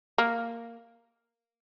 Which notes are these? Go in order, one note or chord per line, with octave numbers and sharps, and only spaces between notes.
A#3